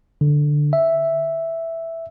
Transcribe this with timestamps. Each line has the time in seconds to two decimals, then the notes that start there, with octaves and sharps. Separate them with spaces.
0.21 D3
0.73 E5